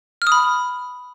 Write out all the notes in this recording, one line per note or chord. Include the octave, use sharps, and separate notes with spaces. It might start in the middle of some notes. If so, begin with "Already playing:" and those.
F6
D#6
B5